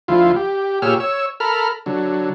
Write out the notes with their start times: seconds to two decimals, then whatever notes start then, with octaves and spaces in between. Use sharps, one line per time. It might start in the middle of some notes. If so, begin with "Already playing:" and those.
0.08 D2 F3 E4 F4
0.36 G4
0.82 A#2 G4 G#4 C#5 E6 F6
1.00 C#5 E6
1.40 A4 A#4 B5 F6
1.86 D3 F#3